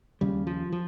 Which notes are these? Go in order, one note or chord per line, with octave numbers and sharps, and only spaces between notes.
D#2 C#3 G3
F3
F3